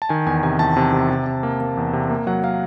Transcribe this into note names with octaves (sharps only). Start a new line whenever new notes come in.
A5
D#3 G#5
E2 G#5
C3 G#5
E2 A5
C3
C3
C3
C3
A#3
A#3
E2
C3
A#3
F#3 F#5
A#3 F5